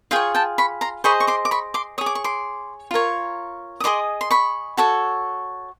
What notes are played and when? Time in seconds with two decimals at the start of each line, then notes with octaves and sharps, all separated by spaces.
0.11 F4 G#4 C#5 F5 G5
0.35 G5 A5
0.58 B5 C#6
0.81 A#5 C6
1.04 G#4 C5 D#5 B5 C#6
1.20 C#6
1.27 C6 D6
1.45 D6
1.51 B5 C#6
1.74 C6 D6
1.98 C#5 D#6
2.01 G#4
2.06 D6
2.15 C#6
2.24 C6 D6
2.91 F4 A#4 C#5
3.80 D#6
3.84 G#4 C5 D#5 C6 D6
4.21 C6
4.31 B5 C#6
4.77 F#4 A4 C#5